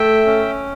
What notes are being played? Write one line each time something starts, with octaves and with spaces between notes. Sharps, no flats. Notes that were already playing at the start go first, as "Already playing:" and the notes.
Already playing: A3 E5 G5
C#4